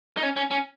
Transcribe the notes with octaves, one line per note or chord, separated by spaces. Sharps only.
D#4
C#4
C#4
C#4